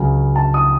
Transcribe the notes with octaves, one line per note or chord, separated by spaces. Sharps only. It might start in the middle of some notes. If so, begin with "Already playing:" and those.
Already playing: C#2 C#3 F#3
A5
D#6